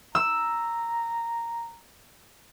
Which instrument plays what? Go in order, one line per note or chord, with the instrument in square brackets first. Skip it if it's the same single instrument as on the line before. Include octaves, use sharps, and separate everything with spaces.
[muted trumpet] A#5 [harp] E6